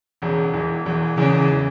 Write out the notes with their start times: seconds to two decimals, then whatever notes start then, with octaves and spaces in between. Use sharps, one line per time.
0.22 E1 E2 C#3
0.53 E1 E2 E3
0.85 E1 E2 E3
1.17 E1 E2 C#3 E3
1.52 E3